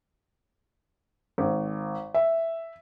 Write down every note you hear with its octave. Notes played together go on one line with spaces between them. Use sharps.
G#1
E5